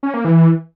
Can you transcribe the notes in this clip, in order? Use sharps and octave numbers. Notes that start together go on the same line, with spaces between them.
C#4
A#3
E3